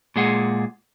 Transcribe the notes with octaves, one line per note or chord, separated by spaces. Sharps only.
A#2 G#3 G#4 F#5